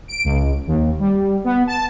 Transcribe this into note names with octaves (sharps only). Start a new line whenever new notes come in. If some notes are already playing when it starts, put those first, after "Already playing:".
D7
C#2
D#2
G3
B3
A5